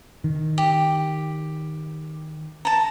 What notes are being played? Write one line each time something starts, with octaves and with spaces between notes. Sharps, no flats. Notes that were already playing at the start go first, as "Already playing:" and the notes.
D#3
G4
A5 A#5